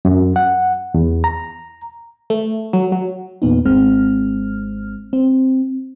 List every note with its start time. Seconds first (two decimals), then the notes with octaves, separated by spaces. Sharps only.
0.05 F#2
0.36 F#5
0.94 E2
1.24 A#5
2.30 A3
2.73 F#3
2.92 F#3
3.42 E2 A#2 B3 D#4
3.65 G#1 G#3 C4 F6
5.13 C4